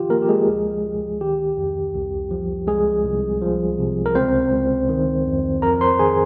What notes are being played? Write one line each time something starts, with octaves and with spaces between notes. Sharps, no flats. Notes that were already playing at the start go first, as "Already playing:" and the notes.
Already playing: D#3 F3 F4 G4
F3 A#3 A#4
G4
G#3 G#4
C#2
C#2
D#3 G4
F2
C2
F3
C2 G#3 G#4
C2
F3
C3
A#4
C#2 C4 C5
C#2
D#3
F2
F2 A#4 A#5
C5 C6
D#3 G#4 G#5